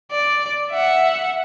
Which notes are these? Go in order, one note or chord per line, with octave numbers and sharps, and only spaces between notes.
D5
E5 F#5